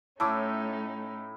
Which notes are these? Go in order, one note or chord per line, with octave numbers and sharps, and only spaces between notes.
A2 A3 C#4 D#4 E4 A5 C#6 D6